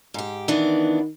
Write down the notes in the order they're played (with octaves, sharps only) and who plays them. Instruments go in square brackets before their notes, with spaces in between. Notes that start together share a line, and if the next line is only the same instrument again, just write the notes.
[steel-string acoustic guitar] G#2 G4
[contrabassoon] D#3 [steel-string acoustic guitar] E3 B3 D4